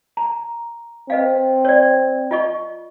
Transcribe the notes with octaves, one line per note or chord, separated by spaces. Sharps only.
A#5
C4 B4 D#5 F5
C#5 D5
F4 D#5 C#6